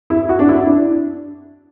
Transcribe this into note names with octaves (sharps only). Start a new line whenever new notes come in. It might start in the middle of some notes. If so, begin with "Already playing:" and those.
E4
F#4
D4
E4
D4